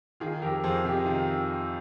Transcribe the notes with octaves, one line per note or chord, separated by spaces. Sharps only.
D#3 F4 G#4
F2 G4 A#4
F2 G#4 C5
C3 D#4 G4
D#3 F4